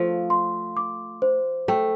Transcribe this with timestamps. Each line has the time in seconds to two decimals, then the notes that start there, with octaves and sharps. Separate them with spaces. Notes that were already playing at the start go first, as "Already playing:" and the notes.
Already playing: F3 A3 F5
0.30 C6
0.77 D6
1.22 C5
1.68 A3 G5